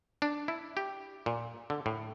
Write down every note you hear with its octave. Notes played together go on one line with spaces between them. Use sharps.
D4
E4
G4
A#2
D3
A2